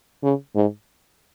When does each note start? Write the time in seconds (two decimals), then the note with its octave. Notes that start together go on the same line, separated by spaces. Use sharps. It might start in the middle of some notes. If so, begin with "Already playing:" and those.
0.23 C#3
0.55 G#2